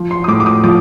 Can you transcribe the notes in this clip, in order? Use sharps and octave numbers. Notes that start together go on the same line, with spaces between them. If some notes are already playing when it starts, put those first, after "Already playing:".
Already playing: F3
C6
D#6
A2 D6
D6
D#6
F3 D6